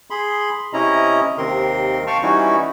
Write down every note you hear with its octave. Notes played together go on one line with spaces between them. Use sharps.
G#4 B5 C6
C3 C#4 E4 D#5 A#5
D#2 C3 D#3 C4 A#4 C6
F5 G5 A5 C#6 F6
E3 G3 C#4 D#4 E4 F#4